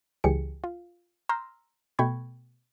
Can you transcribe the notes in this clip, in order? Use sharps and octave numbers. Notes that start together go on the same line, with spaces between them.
C#2 E3 F#3 G4 G#4 C#7
F4
A#5 C6 E6 F6 G6 A#6
B2 A3 G5 B5 C#6 G#6